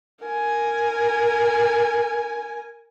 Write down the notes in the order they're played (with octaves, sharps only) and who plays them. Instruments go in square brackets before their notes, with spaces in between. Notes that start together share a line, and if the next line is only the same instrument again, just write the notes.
[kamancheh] A#4 G#5